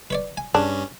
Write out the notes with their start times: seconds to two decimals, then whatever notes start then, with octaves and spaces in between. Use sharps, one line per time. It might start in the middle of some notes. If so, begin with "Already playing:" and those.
0.10 B4 C#5 D5
0.37 G#5
0.55 G2 C#4 D4 G#4